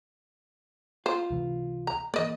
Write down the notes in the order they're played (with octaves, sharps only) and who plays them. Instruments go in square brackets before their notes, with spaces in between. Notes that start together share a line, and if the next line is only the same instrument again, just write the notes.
[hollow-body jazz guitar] F4 [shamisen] C5
[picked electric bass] C#2 C3 E3
[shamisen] A#5
[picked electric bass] E3 A#3 [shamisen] D5 D#5